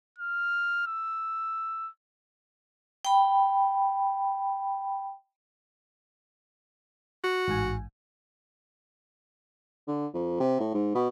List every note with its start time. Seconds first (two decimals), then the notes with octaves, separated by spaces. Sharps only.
0.19 F6
0.88 E6
3.05 G5 B5
7.24 F#4
7.48 A1 G#2 G#5
9.88 D3
10.14 F2
10.40 C3
10.60 A2
10.74 G#2
10.95 B2